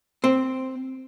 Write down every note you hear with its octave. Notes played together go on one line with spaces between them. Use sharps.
C4